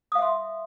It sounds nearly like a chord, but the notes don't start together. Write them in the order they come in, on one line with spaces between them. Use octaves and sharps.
D#6 F5 E5 C6